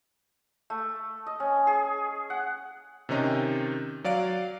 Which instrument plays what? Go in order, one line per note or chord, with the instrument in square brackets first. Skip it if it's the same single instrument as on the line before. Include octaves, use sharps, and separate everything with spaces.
[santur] A3
D#5
C#4
G#4
F#5
[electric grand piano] C3 D#3 C#4 D#4
F#3 D5 F5 D7